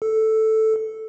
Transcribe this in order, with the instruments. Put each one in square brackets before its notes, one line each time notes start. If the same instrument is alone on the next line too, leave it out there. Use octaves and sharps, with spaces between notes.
[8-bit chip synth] A4